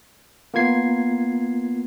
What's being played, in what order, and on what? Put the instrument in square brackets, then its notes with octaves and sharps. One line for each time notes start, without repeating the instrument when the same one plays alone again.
[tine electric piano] A#3 B3 F4 G#6 C7